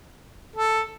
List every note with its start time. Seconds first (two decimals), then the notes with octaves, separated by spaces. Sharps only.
0.56 A4